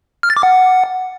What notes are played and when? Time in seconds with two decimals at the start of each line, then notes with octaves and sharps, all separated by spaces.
0.23 F6
0.30 A6
0.37 D6
0.43 F#5